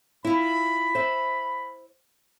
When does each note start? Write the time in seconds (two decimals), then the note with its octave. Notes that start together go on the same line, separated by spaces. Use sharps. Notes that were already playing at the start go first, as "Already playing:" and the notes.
0.25 E4 F4 B5
0.95 C5 E5